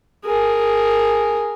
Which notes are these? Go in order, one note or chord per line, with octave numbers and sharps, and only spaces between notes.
G#4 A#4